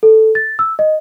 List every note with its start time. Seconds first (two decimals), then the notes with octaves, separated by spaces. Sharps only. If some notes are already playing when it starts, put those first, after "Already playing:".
0.03 A4
0.35 A6
0.59 E6
0.79 D#5